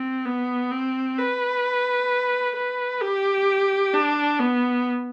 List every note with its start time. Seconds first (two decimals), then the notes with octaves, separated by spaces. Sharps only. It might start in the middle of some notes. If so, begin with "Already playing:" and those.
Already playing: C4
0.25 B3
0.71 C4
1.18 B4
2.56 B4
3.01 G4
3.94 D4
4.39 B3